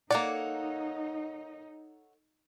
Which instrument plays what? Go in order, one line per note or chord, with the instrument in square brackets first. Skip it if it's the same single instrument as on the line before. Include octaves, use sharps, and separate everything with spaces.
[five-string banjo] A#3 D5 [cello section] D#4 [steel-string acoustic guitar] A4 C#5 F#5